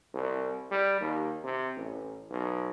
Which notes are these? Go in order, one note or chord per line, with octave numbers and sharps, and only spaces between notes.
C2
G3
D#2
C3
A1
B1